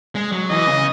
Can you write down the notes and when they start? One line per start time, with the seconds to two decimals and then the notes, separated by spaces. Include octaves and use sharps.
0.15 G#3
0.32 F#3
0.50 E3 D#5
0.68 C#3